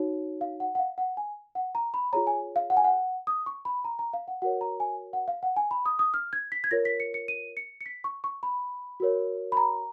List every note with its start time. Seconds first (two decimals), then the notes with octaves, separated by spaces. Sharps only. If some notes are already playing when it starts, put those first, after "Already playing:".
Already playing: D#4 F#4 C#5
0.41 F5
0.60 F#5
0.75 F#5
0.79 F5
0.98 F#5
1.17 G#5
1.55 F#5
1.75 A#5
1.94 B5
2.13 F4 G#4 C#5 A#5
2.27 G#5
2.56 F5
2.70 F#5
2.77 G#5
2.84 F#5
3.27 D#6
3.46 C#6
3.65 B5
3.85 A#5
3.99 A#5
4.13 F5
4.28 F#5
4.42 F#4 A#4 C#5 F#5
4.61 A#5
4.80 G#5
5.13 F#5
5.28 F5
5.43 F#5
5.56 G#5
5.71 B5
5.86 D#6
5.99 D#6
6.14 F6
6.33 G#6
6.52 B6
6.64 G#6
6.71 F4 A#4 C#5 A#6
6.85 B6
7.00 C#7
7.14 C#7
7.28 D#7
7.57 C#7
7.81 C#7
7.86 B6
8.04 C#6
8.24 C#6
8.43 B5
9.00 F#4 A#4 C#5
9.52 B5
9.57 A#5